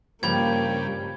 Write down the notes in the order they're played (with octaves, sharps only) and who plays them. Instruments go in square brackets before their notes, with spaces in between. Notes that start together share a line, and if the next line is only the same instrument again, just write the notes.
[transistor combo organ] G2 C#3 G3 [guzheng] F3 G4 [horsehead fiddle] A#3 [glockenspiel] B5 G#6